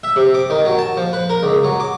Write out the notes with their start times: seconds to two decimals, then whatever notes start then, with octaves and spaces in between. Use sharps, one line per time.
0.03 E5
0.16 C3
0.34 D6
0.50 D#3
0.65 F#3
0.78 A5
0.97 F3
1.13 B4
1.29 A#4
1.43 C#2
1.64 F#3
1.80 D6